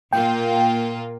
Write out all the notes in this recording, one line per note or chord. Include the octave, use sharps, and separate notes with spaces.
A#2 A#3 F4 G5